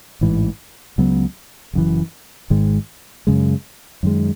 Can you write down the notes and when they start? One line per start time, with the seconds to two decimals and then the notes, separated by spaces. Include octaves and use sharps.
0.21 A1 G#2 E3
0.98 C#2 C#3 F#3 B3
1.73 F#1 F#2 E3
2.50 G#1 G#2 D#3 G#3
3.27 F#2 C#3 G#3
4.03 F#2 D#3 G#3